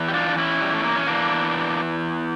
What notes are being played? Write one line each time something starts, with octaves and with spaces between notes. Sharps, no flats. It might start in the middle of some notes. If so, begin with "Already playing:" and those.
Already playing: E2 E3
G4
D4 F4
D4
C#4 E4
G3
A3
A#3
C#4
E2 E3 A#3 D4